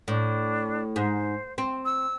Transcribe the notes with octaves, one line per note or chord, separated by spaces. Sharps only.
A2 D4
G#2 C5
C4
E6